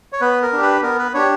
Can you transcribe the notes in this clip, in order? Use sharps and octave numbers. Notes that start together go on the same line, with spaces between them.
C#5
B3 B4
A#4
D4 G4
B4
B3 A#4
B4
D4 G4 C#5